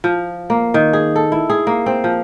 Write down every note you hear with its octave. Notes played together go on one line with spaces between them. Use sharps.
F3
A#3
D#3
G#4
A4
E4
G#4
A#3
C4
F3